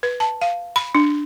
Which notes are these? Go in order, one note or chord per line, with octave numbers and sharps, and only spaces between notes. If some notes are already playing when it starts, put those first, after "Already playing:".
B4
A5
F5
B5
D4